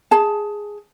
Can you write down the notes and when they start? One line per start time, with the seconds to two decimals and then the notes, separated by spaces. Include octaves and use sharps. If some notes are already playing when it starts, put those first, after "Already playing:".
0.11 G#4 A5